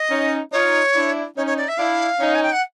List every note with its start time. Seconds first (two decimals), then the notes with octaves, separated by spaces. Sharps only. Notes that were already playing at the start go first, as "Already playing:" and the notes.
Already playing: D#5
0.10 C#4 D#4
0.52 D#4 F4 C#5
0.94 D4 E4
1.36 C#4 D#4 C#5
1.46 C#5
1.57 D5
1.68 E5
1.78 D4 E4 F5
2.20 C#4 D#4
2.34 G#5
2.43 G5
2.52 F#5